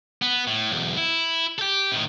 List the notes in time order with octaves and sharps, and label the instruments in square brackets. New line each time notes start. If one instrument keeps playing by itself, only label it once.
[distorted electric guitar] B3
A2
B1 E2
E4
G4 A4
A2 D#3